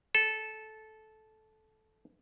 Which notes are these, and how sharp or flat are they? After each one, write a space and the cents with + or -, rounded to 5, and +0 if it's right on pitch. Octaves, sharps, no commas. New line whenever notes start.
A4 -15